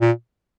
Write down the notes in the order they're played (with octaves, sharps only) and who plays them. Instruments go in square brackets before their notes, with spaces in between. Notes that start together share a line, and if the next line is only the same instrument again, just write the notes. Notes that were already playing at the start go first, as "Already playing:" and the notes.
[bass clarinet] A#2